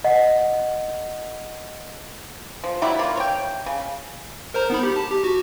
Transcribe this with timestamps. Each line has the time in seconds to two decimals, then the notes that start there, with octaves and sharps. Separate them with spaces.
0.04 D#5 F#5
2.64 F3
2.82 F#3 G3 E4
2.99 A#3 F4
3.17 C#5 G5
3.66 C#3
4.54 A#4 C5 A#5
4.70 B3 D#4 B5
4.83 G4
4.96 A5
5.11 G4
5.24 F#4